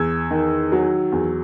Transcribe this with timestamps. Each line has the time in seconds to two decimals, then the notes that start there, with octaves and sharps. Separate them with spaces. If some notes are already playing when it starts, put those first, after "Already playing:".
Already playing: E2 E6 G#6
0.31 D#3
0.72 F#3
1.12 E2